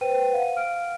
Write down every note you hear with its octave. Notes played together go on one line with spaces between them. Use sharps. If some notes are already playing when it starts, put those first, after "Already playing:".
B4 C5 G5 D#7
F5 F#5
F5 F6 D7